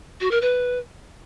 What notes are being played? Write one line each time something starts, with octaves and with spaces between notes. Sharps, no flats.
F#4
A#4
B4